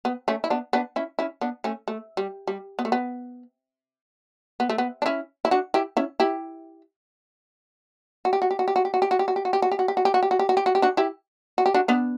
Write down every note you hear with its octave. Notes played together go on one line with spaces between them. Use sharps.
B3
A3 C#4
E4
B3 D4
B3 D4
C#4 E4
C#4 E4
B3 D4
A3 C#4
A3
G3
G3
B3
A3
B3
B3
A3
B3
D4
C#4 E4
E4
D4 F#4
E4 G4
C#4 E4
E4 G4
F#4
G4
F#4
G4
F#4
G4
F#4
G4
F#4
G4
F#4
G4
F#4
G4
F#4
G4
F#4
G4
F#4
G4
F#4
G4
F#4
G4
F#4
G4
F#4
G4
F#4
G4
D4 F#4
E4 G4
F#4
G4
D4 F#4
B3 D4